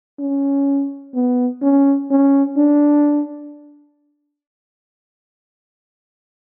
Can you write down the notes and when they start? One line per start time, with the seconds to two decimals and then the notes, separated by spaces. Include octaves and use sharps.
0.19 C#4
1.14 B3
1.62 C#4
2.10 C#4
2.57 D4